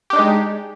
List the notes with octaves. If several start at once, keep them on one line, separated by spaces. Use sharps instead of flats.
G#3 D4 D#4 G4